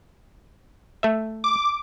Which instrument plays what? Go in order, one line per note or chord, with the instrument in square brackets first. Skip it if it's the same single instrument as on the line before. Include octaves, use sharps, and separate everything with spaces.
[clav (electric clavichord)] A3 E5
[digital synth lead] D6